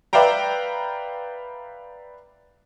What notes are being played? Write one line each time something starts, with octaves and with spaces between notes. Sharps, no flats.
B4 D5 E5 F5 G5 A#5